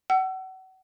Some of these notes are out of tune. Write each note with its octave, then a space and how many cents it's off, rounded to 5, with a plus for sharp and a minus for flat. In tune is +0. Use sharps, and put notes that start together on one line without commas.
F#5 +35 E6 +25